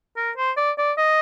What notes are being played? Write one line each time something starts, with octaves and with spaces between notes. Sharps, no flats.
A#4
C5
D5
D5
D#5